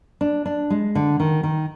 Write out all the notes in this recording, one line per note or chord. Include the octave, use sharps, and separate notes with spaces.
D4
D4
G#3
D3
D#3
D#3